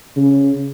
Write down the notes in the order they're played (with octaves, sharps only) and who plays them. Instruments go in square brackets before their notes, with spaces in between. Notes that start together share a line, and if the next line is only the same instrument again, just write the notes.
[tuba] C#3